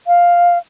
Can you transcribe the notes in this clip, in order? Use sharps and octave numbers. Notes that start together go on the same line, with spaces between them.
F5